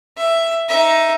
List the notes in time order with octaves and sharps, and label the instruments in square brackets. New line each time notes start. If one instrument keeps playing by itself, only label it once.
[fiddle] E5
D#4 E5